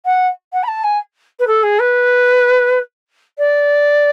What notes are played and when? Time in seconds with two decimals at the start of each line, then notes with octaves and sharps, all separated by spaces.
0.05 F#5
0.53 F#5
0.63 B5
0.68 A5
0.84 G#5
1.39 B4
1.47 A4
1.63 G#4
1.79 B4
3.38 D5